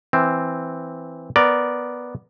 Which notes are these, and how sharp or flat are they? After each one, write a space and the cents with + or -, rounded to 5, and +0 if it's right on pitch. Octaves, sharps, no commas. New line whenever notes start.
E3 +0 C4 +0
B3 +0 A#4 +0 D5 +0